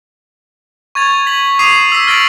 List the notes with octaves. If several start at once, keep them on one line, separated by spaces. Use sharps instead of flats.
C#6 G#6 A6 F7
B6 F#7
D6 D#6 C7 D#7 F7
E6 B6
F6 A6 A#6 D7 F#7